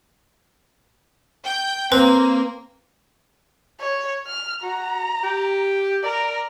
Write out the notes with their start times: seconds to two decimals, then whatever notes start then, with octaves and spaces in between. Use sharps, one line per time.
1.44 G5
1.92 A#3 C4 B4
3.80 C#5
4.27 F6
4.63 F#4 A#5
5.24 G4
6.03 A#4 D5